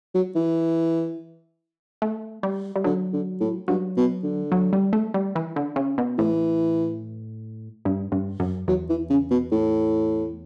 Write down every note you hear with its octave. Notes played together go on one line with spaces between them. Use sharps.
F#3
E3
A3
G3
G3
D3 F#3
D3
A2
G2 F#3
B2
D3
F#3
G3
A3
G3
E3
D3
C#3
B2
A2 E3
G2
G2
F#2
E2 F#3
E3
C#3
B2
A2